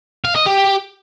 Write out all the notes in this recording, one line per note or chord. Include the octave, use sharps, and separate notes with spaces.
F5
D#5
G4